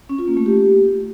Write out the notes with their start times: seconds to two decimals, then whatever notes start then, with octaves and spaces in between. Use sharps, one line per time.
0.09 C#4
0.19 F4
0.28 A#3
0.37 A3
0.46 G4